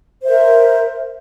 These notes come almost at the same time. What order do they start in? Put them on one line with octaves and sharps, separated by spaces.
C5 E5 A#4